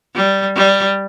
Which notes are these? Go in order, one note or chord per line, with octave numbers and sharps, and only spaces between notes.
G3
G3